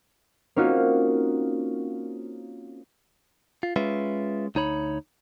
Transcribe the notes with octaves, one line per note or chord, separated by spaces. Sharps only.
A#3 C4 C#4 D#4 F4 F#4
F4
G#3 C#4 F4 B4 E5
D2 D#4 C#5 B5